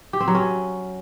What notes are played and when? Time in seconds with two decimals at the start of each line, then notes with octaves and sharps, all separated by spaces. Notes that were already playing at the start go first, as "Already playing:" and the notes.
0.13 G4
0.20 C4
0.28 F#3
0.35 C#4